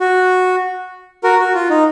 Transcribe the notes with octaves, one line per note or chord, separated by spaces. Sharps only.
F#4
F#4 A#4
F#4
F4
D#4